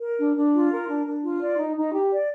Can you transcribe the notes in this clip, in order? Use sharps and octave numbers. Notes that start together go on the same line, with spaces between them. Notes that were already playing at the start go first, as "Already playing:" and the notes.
A#4
D4
D4
F4
A#4
D4
D4
F4
D5
D#4
D#4
G4
D5